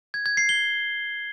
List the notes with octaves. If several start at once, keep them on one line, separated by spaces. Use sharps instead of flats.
G#6
G#6
C7
G7